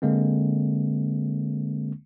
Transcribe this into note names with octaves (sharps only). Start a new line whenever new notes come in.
D3 G#3 A#3 C4